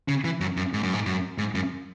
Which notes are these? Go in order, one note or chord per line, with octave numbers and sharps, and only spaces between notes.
C#3
E3
F#2
F#2
G#2
F#2
G#2
F#2
G#2
F#2